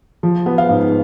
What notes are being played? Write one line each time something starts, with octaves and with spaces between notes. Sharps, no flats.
F3
B3
F5
G#2